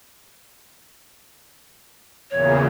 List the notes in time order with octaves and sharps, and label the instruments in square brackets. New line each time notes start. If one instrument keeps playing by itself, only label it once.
[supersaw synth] E2 A#2 C#3 [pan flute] C#5